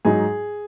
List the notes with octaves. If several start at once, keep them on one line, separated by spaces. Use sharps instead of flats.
G#2 F#3 D#4 G#4